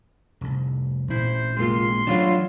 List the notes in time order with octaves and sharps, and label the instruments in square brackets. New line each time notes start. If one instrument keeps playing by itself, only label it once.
[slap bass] F1 C2
[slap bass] A1 A#2 C4 [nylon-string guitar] E4 [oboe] C5
[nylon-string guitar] C3 A#3 F4 [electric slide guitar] G#3 [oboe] C6
[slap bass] E3 A3 [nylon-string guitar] F#3 C#5 [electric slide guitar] D4 F4